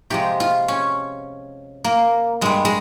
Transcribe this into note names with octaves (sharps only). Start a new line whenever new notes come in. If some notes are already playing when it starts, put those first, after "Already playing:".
C3 F3 G#3 G4
F4
C#4
A#3
G2 G3 G#3
G#3